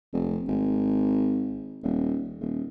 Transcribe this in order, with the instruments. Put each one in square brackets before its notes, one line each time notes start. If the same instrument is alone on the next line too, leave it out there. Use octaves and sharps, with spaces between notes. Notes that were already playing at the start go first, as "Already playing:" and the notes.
[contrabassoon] F1
G#1
D#1
D#1